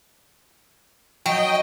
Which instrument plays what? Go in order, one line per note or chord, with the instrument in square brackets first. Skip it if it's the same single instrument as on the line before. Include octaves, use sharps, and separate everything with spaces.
[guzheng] F#3 [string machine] D#5 [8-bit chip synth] G5